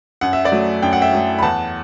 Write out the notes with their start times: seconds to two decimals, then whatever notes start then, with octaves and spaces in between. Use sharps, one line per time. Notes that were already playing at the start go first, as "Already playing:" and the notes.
0.21 F#2 F#5
0.33 E5
0.45 D5 F#5
0.52 F#3 A3
0.82 F#2 G5
0.93 F#5
1.02 E5 G5
1.13 F#3 A3
1.38 B5
1.43 E2 F#5 A5